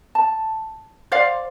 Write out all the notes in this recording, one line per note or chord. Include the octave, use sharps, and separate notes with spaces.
A5
C5 D5 F5